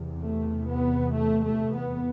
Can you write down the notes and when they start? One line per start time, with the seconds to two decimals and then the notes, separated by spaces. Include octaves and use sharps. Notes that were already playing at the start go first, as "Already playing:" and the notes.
Already playing: E2 C3
0.22 A3
0.66 B3
1.12 A3
1.42 A3
1.73 B3